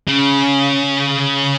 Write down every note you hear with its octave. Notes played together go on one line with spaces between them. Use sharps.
C#3